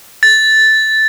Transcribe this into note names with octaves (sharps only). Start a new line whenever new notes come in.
A6